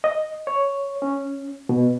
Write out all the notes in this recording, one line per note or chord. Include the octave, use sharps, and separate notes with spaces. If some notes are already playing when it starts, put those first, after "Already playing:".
D#5
C#5
C#4
B2